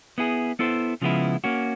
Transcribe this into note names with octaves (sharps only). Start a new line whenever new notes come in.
B3 E4 G#4
B3 E4 A4 C5
C#3 F3 G#3 B3 E4
A#3 C#4 F#4